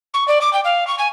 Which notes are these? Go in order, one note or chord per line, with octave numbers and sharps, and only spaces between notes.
C#6
D5
D6
G5
F5
C#6
G#5